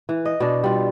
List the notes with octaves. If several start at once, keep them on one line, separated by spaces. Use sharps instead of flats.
E3
D#5
B2 D4
G3 F4